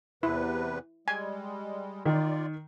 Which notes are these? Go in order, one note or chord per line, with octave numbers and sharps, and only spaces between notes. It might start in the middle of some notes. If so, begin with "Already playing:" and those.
E2 C3 E4 B4
G3 G#3 G#5
D#3 F4 D5